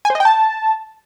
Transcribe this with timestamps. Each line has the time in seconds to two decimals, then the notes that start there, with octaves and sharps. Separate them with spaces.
0.05 G#5
0.10 C5
0.15 D#5
0.20 G5
0.25 A5